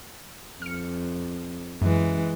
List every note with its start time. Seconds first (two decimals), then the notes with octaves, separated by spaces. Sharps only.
0.62 F2 F6 C#7
1.82 F#2 E3 G#3